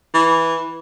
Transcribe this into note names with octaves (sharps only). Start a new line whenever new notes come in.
E3